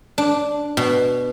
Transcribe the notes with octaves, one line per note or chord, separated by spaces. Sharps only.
D4
B2